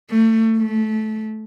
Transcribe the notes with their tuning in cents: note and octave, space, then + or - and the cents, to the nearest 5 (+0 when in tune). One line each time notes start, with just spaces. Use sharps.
A3 +25
A3 -15